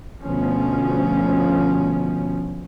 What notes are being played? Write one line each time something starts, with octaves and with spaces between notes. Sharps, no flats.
D2 B2 F3 C#4